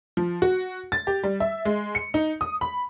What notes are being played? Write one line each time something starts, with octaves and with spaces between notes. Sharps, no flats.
F3
F#4
A6
G4
G3
E5
G#3
C#7
D#4
D#6
B5